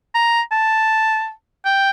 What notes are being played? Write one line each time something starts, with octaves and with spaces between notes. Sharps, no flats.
A#5
A5
G5